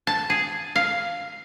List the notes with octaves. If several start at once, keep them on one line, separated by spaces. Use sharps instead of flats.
A5
G#4
F5